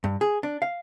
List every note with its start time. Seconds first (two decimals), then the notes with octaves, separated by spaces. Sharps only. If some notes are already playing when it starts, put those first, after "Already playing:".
0.04 G2
0.21 G#4
0.43 D4
0.62 F5